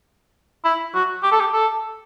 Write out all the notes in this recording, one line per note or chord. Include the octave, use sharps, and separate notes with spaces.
E4
F#4
G4
A4
G4
A4